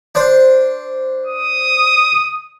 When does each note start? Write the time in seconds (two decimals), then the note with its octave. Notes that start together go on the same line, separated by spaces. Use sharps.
0.15 D4 C5
1.26 D#6